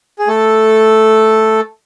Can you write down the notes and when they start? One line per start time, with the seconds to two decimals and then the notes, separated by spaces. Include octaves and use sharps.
0.19 G#4
0.28 A3 A4